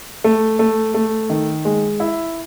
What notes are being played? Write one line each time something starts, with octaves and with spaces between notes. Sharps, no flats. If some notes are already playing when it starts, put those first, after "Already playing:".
A3
A3
A3
D#3
G#3
E4